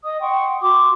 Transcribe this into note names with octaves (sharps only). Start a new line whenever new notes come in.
D#5 D#6
F#5 G5 C6 C#6
F#4 C6 D6